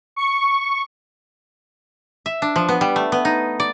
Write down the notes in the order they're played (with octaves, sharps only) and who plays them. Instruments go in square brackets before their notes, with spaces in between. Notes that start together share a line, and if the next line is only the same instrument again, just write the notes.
[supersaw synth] C#6
[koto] E5
D4
F3
B3
G3
A3
B3
D#4
D5